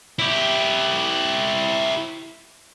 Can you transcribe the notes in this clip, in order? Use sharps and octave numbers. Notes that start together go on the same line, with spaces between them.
E4 G4